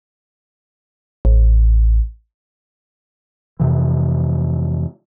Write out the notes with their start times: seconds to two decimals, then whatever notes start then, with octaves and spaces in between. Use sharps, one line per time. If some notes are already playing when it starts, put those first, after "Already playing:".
1.25 A1
3.60 F2 C3 E3